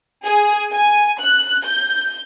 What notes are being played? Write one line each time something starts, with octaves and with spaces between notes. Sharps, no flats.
G#4
G#5
F#6
G6